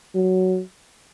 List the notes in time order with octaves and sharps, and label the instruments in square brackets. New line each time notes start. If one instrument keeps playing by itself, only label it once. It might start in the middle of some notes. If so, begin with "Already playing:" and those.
[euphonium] F#3